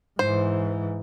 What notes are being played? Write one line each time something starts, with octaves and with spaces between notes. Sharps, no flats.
G#2 E3 C5